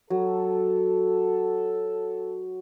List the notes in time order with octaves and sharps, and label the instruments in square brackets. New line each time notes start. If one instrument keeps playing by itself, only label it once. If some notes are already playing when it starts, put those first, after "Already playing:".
[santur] F#3 [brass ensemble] A4